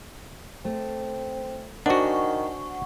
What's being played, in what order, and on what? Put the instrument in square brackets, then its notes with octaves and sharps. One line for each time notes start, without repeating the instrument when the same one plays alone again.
[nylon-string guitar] A3 [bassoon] C4
[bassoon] D#3 [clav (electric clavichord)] D4 F#4 [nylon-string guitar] C5 E5 G#5 [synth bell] F#5 C#6